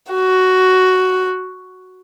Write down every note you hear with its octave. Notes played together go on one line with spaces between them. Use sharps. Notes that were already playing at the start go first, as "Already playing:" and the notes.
F#4